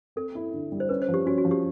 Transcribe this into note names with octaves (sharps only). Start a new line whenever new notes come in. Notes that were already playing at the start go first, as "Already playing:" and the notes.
C4 A4
E4
D3
G3
C5
C#4 B4
C5
F3
G4
C#4 F#4
F#4
F3
G4